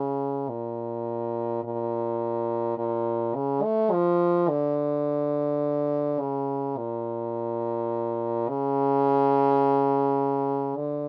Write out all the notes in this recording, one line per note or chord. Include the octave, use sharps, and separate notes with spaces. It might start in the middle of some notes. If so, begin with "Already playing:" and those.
Already playing: C#3
A#2
A#2
A#2
C#3
A3
F3
D3
C#3
A#2
C#3
D3